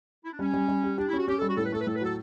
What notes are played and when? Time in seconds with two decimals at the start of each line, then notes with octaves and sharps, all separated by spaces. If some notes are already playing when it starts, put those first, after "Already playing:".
0.24 E4
0.32 D4
0.39 G3 C#4
0.54 G3
0.68 G3
0.83 G4
0.97 D4 G4
1.07 E4
1.13 C#4 F#4
1.28 C#4 G4
1.37 A4
1.42 G3
1.48 F#4
1.56 A2 A4
1.65 B4
1.72 A3 A4
1.80 B4
1.87 A2 A4
1.95 B4
2.01 F#3 A4